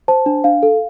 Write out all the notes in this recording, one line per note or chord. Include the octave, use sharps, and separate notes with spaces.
C5 A5
D4
D4 F5
A4